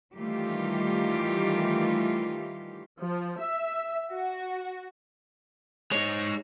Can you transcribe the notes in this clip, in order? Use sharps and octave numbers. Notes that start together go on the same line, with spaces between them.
D#3 E3 G3 A3 F4 G4
F3
E5
F#4
G#3 D#4 C#5